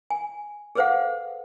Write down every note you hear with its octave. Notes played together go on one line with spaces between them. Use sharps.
G#5
G#4 A4 B4 C5 F5 F#5